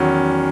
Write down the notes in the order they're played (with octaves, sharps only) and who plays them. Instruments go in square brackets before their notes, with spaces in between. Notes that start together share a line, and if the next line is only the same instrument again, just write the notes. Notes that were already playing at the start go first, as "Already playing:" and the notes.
Already playing: [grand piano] E2 D#3 F#3 C#4